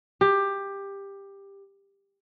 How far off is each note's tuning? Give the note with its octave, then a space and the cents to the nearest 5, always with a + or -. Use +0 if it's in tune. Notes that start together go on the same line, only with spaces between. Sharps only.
G4 +15